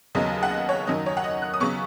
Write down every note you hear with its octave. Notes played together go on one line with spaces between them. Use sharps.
D#2 C#3 F#3 B3 D#5
F#5
D#5
C#5
F#2 D#3 F#3 D#5
C#5
F#5
D#5
F#6
D#6
C#3 F#3 B3 C#6